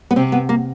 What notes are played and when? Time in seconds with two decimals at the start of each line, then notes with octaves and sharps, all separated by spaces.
0.11 B3
0.16 C3 C4
0.32 B3
0.49 A#3